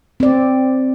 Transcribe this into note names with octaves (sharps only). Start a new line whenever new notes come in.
C4 D5